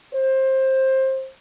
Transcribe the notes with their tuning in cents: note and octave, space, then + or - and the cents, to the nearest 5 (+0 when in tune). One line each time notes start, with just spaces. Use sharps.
C5 +20